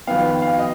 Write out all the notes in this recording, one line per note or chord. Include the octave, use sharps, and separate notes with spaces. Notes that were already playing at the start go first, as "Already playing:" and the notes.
F2 D#3 B3 F5
F5
D#5